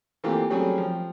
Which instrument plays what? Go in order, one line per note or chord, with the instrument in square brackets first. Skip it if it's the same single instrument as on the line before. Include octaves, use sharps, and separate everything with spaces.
[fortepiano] E3 A3 A#3 C4 F4 G4
F#3 G3 A3 C4 C#4 G#4
F3 G5